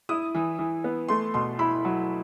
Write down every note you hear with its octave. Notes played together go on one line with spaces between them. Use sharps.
E4 D#6
E3
E3
B3
A3 C6
B2 C6
E4 B5
F#3